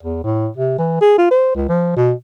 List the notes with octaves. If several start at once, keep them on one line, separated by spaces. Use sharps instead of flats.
E2
A2
C3
E3
G#4
F4
C5
C#2
F3
B2